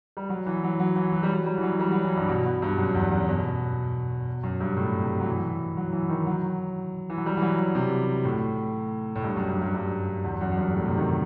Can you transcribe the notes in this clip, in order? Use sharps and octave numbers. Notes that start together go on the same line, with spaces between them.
G3
F#3
E3
F#3
F#3
E3
F#3
G3
F#3
G3
E3
F#3
G3
F#3
E3
G2
B2
B2
G2
F#2
E2
F#2
B2
F#2
G2
A2
C3
F#3
E3
F#3
E3
D#3
F#3
E3
F#3
G3
E3
F#3
E3
C3
A2
A2
G2
F#2
G2
G2
G2
E2
F#2
F#2
G2
A2
C3
D#3